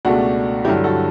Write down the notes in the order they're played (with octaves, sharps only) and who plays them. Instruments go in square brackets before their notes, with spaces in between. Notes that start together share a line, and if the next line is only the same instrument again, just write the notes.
[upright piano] C#2 B2 A3 D4 F#4
G2 D3 F#3 E4 G4
F#4 A4